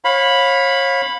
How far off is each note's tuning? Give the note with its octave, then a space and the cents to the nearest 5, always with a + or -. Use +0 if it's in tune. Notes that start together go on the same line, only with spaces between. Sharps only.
C#5 -30 F5 +25 B5 +0